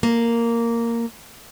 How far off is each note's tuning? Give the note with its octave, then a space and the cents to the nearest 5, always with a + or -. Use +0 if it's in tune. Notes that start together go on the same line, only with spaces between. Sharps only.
A#3 -5